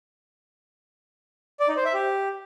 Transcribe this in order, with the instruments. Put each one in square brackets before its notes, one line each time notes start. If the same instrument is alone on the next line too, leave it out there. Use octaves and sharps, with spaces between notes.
[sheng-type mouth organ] D5
D#4
C5
E5
G4